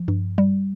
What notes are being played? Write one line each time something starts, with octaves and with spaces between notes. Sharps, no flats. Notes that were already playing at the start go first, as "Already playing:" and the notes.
Already playing: F3
G2
G3